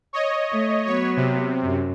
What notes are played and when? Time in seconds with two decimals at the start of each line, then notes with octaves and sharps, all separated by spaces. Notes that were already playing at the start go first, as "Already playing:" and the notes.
0.13 C#5 D#5
0.52 A3
0.87 F#3 B3 C#5
1.17 C3
1.63 F#2